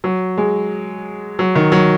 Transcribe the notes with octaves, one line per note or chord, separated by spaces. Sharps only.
F#3
G#3
F#3
D#3
F#3